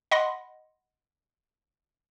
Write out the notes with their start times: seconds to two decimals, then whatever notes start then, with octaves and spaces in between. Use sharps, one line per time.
0.11 D#5 F#5 B5 C6 A#6